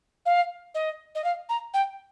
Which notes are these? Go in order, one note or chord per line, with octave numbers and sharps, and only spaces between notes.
F5
D#5
D#5
F5
A#5
G5